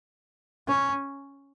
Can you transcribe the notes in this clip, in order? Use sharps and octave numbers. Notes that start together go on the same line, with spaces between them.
C#4